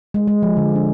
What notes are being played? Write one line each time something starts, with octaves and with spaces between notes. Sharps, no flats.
G#3
G#3
F3
D3
D4